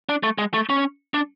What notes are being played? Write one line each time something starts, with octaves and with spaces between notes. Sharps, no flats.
D4
A3
G#3
A3
C#4
D4